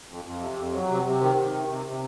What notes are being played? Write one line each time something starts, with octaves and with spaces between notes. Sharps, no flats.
F2
F2
C3
F2
F#3
C3
C3
D#3
D#3
C3
C3
C3